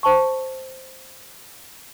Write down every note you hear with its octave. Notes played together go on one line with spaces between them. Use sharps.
C5 A5 C#6